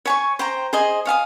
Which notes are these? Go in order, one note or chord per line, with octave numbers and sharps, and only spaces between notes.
C#5 G#5 C#6
C5 G5 A#5
G#4 C5 D#5 G#5
C#5 F5 G#5 D#6